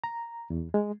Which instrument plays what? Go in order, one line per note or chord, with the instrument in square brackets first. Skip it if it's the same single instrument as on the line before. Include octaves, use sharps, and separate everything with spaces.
[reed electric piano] A#5
E2
G#3